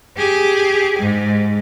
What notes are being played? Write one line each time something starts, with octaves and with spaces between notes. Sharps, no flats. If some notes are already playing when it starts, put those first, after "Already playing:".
G4 G#4
G#2